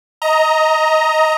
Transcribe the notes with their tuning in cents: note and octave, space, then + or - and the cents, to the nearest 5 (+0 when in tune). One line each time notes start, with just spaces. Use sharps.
D#5 +20 A#5 +0